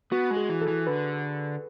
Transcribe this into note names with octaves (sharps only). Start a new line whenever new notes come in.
B3 F#4
G#3
G#4
E3
A4
E3
D3 B4